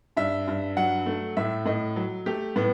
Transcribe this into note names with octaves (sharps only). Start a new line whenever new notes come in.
G2 E5
G2
F#3 F#5
A3
A2 E5
A2 D#5
F#3
A3 G4
A2 B3